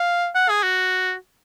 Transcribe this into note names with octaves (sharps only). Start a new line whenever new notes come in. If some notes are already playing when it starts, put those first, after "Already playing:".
Already playing: F5
F#5
G#4
F#4